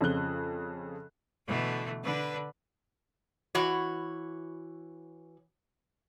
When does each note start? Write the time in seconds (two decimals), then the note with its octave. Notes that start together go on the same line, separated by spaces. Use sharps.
0.01 F2 C#3 F3 F#6 G7
1.45 B2 D3 E3 A3
2.03 D3 D4 B4 B5
3.55 E3 F#4 C#5